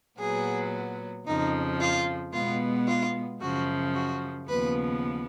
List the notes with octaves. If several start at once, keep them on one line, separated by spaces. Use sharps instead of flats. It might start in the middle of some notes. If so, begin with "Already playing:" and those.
A#2 F#3 B3 G#4
F2 C#3 F3 D#4
F4
B2 G#3 B3 F4
F4
F#2 C#3 F3 F#4
F#4
D#2 C#3 F3 B3 B4